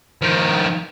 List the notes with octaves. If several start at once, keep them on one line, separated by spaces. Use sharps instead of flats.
D#3 F3